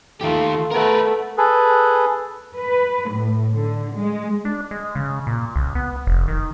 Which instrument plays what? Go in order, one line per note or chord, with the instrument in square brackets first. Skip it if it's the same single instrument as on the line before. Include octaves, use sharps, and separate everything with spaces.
[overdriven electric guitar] D#3 G4 [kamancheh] A3 F4
[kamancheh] A3 B3 [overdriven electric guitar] A#4 B4
[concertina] G#4 A4 B4
[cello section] B4
A2
D3
G#3
[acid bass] D4
G#3
C#3
A#2
C#2
B3
F1
D#3